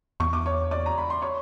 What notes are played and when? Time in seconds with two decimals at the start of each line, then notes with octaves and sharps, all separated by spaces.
0.20 E2 C#6
0.33 D6
0.46 C#5 C#6
0.71 D5 D6
0.86 A#5
0.98 B5
1.10 C6
1.22 C#5 C#6